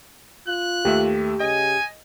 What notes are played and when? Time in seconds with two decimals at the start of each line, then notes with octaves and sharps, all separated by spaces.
0.48 F4 F#6
0.85 D#2 A3 G4 E5
1.40 C#3 D#5 G#5